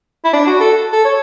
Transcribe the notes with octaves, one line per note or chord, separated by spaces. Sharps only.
E4
D4
F#4
A4
A4
C#5